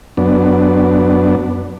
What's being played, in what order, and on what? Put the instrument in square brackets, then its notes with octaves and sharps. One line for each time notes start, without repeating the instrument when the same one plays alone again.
[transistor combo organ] F#2 B3 D4